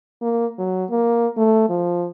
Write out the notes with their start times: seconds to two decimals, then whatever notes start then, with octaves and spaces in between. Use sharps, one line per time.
0.22 A#3
0.58 F#3
0.90 A#3
1.37 A3
1.69 F3